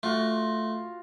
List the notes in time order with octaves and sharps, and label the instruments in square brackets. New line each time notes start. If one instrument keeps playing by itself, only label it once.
[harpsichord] A3 [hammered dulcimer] F4 F#4